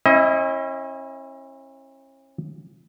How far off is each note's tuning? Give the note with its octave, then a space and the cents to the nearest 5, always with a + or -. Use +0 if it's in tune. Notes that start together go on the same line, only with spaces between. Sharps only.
C#4 -40 E4 +0 D#5 +25